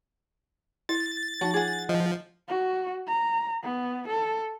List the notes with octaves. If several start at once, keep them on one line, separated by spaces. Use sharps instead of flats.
E4 A6
F3 D#4 F#4 A5
F4 G#4 F#5 G#5
F3 D#5
F#4
A#5
B3
A4